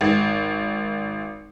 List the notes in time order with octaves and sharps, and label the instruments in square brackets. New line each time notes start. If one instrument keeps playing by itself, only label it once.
[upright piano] G#1